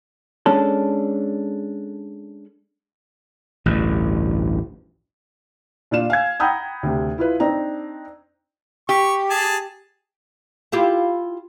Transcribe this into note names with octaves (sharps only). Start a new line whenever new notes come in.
G#3 C#4 D4 A4
A1 D2 G2
A#2 D4 F4 E7
F5 G#5 G#6
F#5 G5 A#5 B5 D#6 G6
D2 C3
E4 F4 B4
C4 D4 D#4 A#5
G4 C#6
G#4 G#5 A5
E4 F4 G4